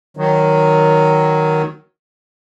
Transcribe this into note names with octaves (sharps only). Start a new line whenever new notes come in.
D#3 F#3